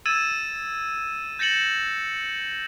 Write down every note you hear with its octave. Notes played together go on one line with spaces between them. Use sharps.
E6 G#6 A6 D#7 E7
G6 A6 A#6 C#7 E7 F#7